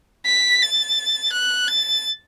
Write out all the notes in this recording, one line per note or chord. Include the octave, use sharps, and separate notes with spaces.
B6
A6
F#6
A6